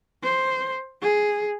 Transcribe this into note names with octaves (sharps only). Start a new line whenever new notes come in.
C5
G#4